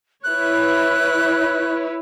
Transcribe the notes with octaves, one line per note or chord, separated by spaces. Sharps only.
E4 B4 C#5 F#6